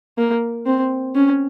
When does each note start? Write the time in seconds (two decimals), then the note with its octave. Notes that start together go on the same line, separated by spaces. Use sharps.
0.18 A#3
0.66 C4
1.15 C#4